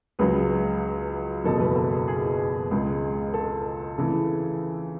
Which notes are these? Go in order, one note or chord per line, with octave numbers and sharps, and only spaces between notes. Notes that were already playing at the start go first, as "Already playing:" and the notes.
C#2 C#3 F#3 B4
F#1 E2 B2 F#3 A4
B4
A4
G#4
G#4
C#2 C#3 G#3
A4
C#3 E3 A3